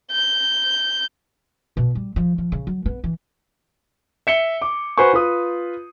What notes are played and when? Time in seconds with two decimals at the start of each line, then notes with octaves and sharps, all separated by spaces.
0.12 G6
1.77 B2
1.95 G3
2.16 F3
2.38 F3
2.52 C#3
2.67 F#3
2.86 B3
3.04 E3
4.27 E5 C#7 G7
4.62 D6
4.98 F#4 B4 C5 G#5 C#6
5.13 F4 B4 D#6